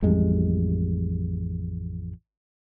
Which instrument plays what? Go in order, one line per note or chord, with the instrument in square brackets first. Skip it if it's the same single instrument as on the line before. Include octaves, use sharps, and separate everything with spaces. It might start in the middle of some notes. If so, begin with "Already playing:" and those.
[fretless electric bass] A1 F2 G3 G#3